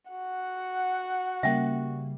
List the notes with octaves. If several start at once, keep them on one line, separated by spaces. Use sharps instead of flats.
F#4 F#5
C#3 G3 A#3 E5 G5